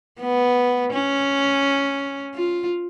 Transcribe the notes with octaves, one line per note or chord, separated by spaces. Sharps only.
B3
C#4
F4